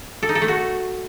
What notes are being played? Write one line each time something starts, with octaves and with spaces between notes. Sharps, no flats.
A4
D#4
A4
A3
F#4